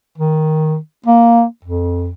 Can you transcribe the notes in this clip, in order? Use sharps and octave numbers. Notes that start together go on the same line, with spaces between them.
D#3
A#3
F2